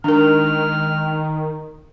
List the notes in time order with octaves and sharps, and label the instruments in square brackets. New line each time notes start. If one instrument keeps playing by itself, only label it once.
[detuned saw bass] D#3 [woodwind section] G#3 D#4 F6 [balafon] D4 A#4